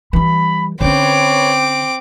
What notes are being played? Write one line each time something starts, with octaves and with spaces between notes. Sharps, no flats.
E3 G3 B5
D3 C4 C#4 B4 C#5 D6